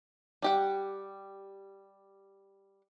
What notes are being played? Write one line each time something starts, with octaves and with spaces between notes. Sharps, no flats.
G3 G4 F#5